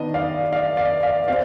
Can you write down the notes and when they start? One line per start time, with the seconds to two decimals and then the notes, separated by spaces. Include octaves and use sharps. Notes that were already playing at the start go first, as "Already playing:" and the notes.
Already playing: D#3 B3 D4 D#5
0.14 D5 F5
0.53 D5 F5
0.77 D5 F5
1.03 D5 F5
1.28 C4 D5 F5